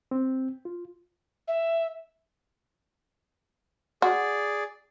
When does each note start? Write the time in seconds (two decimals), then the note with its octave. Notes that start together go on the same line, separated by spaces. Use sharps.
0.11 C4
0.65 F4
1.47 E5
4.02 F#4 G#4 D5